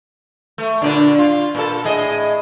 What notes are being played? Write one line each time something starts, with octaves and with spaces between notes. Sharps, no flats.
A3
A#2 D3 D4
F4
A#2 A4
A2 G#4 D#5